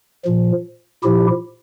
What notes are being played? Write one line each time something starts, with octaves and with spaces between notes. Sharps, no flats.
A#2 F3
A#2 F3 E4 G4